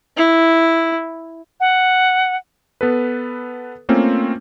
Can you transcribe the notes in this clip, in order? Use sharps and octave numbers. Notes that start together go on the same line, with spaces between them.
E4
F#5
B3 A4 B4
A3 A#3 C4 C#4 F4